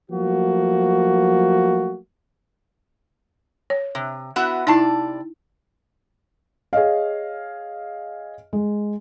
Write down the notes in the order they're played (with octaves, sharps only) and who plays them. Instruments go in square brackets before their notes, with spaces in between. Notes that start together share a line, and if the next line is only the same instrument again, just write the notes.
[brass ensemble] F3 F#3 A3 A#3 F#4
[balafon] C#5
[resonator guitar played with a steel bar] C3
B3 E4 F#4
[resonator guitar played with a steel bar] C3 D5 A5 [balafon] D#4 E4
[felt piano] G#4 C#5 D#5 F5
G#3